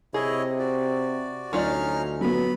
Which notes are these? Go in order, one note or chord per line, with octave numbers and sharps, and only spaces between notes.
C3 E4 G#4 C#5 D#5
F#4 D5
D2 F#3 C#4 D#4 F4 D5 F6
F#3 B3 B5